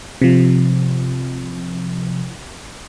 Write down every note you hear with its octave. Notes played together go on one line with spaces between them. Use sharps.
C3 F3